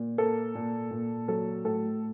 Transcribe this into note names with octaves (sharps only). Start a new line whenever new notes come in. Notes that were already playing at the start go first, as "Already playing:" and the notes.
Already playing: A#2
A#3 A4
A#2
A#2
F#3 A4
A2 A4